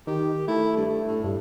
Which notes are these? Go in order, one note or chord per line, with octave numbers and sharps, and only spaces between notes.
D#3 G4
A3 E4
G2
A2
G2